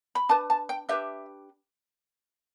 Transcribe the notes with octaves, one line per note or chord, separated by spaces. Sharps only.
B5
D4 B4 A5
A5
G5
D4 G4 B4 E5